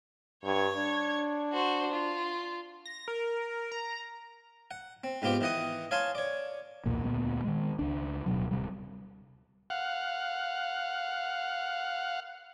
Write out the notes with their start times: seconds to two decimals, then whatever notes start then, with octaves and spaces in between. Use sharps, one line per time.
0.44 G2 C#5 G#6
0.76 D4
1.53 F#4 C5
1.92 F4
2.85 A#6
3.08 A#4
3.72 A#5
4.71 F#5
5.04 C4
5.22 G#2 B3 C4 F4 G4 G5
5.41 D#3 E3 D#5 F#5 D#6
5.91 C#5 F5 G#5 A5 C6
6.15 C#5 D5
6.86 B1 E2 A#2 A#3
7.04 D2 A#2 A3 B3
7.44 D#3 G#3
7.79 C#2 D4
8.26 D1 B2 F#3
8.51 D1 C3 G3
9.70 F5 F#5